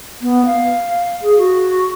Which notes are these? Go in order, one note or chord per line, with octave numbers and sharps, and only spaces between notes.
B3
F5
G#4
F#4